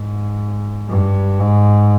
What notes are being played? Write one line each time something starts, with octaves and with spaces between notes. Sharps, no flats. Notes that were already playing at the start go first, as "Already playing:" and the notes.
Already playing: G#2
G2
G#2